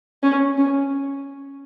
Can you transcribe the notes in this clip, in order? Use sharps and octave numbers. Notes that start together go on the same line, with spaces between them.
C#4
C#4